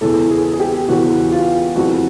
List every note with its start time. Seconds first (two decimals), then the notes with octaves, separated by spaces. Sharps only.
0.01 E2 C#3 E3 A4
0.31 G#4
0.53 G#4
0.60 G4
0.88 E2 C#3 E3 F#4
1.32 F4
1.76 F2 C#3 E3 F#4